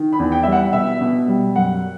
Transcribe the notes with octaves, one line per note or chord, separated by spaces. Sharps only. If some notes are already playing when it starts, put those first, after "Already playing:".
Already playing: D#3
B5
E2
G5
G3 E5
F#5
B2 E5
B2
G3
F#2 F#5